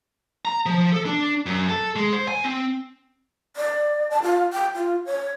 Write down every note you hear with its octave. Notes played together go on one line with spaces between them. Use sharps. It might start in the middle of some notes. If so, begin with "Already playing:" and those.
A#5
F3
A4
D4
F#2
A4
G#3
C5
G#5
C4
D5
A5
F4
G5
F4
C#5